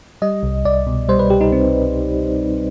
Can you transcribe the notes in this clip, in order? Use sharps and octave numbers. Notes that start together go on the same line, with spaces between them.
G3 D#5
C2
C2 D5
B2
G3 C5
B4
C2 G4
D#4
C2 C4